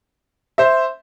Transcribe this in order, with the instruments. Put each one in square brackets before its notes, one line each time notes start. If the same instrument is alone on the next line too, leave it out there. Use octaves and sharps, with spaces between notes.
[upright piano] C5 E5